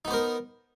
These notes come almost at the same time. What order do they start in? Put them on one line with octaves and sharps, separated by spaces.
D#4 B3 C5 A#4